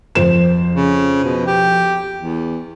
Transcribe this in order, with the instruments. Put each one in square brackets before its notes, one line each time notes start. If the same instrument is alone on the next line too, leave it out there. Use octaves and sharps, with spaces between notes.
[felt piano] F2 C5 E7
[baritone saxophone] C#3
B2
G4
E2